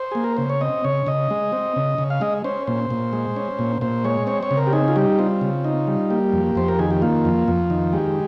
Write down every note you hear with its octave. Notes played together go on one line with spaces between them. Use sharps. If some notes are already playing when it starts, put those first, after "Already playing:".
Already playing: C5
A#3 G#4
A#4
C#3 C5
C#5
C4 D#5
C#3 C#5
C#3 D#5
G#3
C4
C#3
C#3
F5
G#3 D#5
C#4 C5
A#2 C5
A#2
G#3
C#4
A#2
A#2 C5
G#3 C#5
C4 C#5
C#5
C#3
A#4
G4
D#4 G#4
F4
G3 G4
C4 F4
C#3
D#4
G3
A#3 G4
F2
F2 C5
A#4
D#3 G#4
G4
A#3 F4
F2
F2
D#3
G#3 G4